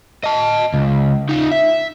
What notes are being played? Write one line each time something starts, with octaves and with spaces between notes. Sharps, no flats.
D#5 A5
C#2
D#4 F4
E5